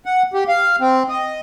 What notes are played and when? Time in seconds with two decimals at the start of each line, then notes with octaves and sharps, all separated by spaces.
0.06 F#5
0.34 G4
0.48 F5
0.80 C4
1.09 D#5